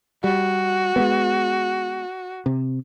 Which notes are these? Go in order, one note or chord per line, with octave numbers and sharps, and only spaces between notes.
G3 F#4
G#3 A#3 B3
C3